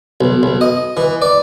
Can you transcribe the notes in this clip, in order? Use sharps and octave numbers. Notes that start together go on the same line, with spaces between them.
B1
B1
D#5
E3
D5